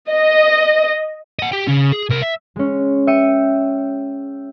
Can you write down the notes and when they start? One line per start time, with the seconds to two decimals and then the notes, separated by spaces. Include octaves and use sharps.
0.11 D#5
1.39 D#5 F#5
1.52 G4 G5
1.67 C#3 C#4
1.92 G#4
2.09 C2 A#4
2.22 E5
2.56 G#3 C#4
3.07 E5 G5 C#7 D#7